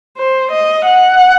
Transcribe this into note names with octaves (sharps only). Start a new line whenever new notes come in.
C5
D#5
F#5